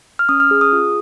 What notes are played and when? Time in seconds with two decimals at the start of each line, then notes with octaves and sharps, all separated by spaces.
0.19 F6
0.29 C#4 D#6
0.40 F6
0.51 G#4
0.61 D#6
0.73 F4